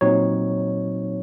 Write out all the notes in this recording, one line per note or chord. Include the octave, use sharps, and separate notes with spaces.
A#2 F#3 C4 D#4 C#5